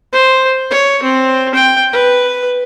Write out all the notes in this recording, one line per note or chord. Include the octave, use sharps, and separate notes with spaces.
C5
C#5
C4
G5
B4